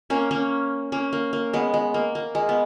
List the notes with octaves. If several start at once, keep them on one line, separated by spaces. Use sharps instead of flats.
A#3 C#4
A#3 C#4
A#3 C#4
A#3
A#3
G#3 B3
G#3
A#3
A#3
G#3
B3